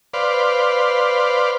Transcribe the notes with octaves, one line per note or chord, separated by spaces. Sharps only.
B4 C5 D5 F5